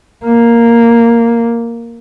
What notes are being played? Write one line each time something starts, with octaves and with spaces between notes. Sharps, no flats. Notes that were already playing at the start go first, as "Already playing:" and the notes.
A#3